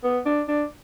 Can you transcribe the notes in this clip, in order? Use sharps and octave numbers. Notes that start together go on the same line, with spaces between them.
B3
D4
D4